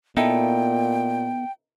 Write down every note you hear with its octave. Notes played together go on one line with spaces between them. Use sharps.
A#2 B3 D#4 E4 A4 G5